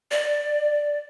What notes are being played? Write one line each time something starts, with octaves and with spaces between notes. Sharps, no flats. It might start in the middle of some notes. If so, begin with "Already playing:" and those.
D5